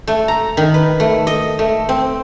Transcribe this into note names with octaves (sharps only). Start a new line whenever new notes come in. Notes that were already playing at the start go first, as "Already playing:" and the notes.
A3
A#5
D#3
B4
A3
D#5
A3
C4